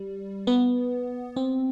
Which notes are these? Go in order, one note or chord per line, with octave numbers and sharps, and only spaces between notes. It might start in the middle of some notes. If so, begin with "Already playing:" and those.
Already playing: G3
B3
C4